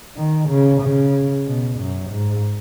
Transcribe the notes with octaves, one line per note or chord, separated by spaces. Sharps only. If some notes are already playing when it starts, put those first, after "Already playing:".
D#3
C#3
C#3
B2
F#2
G#2